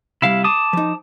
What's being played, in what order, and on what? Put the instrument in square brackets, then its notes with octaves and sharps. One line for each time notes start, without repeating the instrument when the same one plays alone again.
[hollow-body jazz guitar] C3 G3 [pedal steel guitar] E4 F5
[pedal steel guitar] A5 D6 D#6 [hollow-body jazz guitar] C6
[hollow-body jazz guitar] F3 D#4